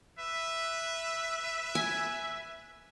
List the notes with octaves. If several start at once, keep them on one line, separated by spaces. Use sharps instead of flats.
B4 E5
G#5